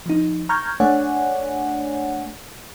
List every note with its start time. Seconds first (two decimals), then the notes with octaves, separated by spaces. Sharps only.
0.06 F3 D#4
0.49 A#5 C#6 F6 G6 G#6
0.80 A3 D4 C#5 D5 F#5 G#5